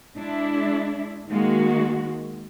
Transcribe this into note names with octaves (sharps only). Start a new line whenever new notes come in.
G#3 D4 E4
D#3 G#3 A#3 F#4